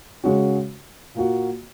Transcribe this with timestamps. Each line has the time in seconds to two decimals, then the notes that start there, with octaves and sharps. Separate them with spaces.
0.24 C#3 G#3 C#4 F#4
1.15 A#2 A#3 F#4